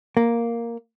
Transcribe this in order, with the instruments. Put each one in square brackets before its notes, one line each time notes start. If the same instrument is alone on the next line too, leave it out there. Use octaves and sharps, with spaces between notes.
[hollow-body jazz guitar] A#3